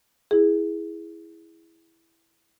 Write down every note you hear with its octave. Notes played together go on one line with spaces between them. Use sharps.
E4 G#4